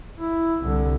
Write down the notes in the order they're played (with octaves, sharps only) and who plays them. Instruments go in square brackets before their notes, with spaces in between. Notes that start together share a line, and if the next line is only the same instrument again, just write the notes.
[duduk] E4
[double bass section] C2 [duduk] D3